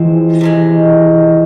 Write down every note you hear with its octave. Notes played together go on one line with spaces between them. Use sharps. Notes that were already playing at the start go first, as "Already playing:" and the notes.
Already playing: E3 F3 G#3 C4
C3 F3 G#3